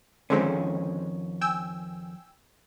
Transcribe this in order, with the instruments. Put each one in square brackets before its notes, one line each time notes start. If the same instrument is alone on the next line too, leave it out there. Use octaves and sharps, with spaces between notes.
[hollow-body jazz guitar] F2 D#3 C#4 [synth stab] D3 G#3 C4
[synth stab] G5 G#5 E6